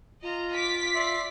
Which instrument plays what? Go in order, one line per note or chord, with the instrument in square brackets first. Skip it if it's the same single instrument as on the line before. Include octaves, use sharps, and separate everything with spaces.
[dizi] F4 [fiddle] D#5 A#5
[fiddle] D6 [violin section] B6
[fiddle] D5 [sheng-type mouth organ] E5 C6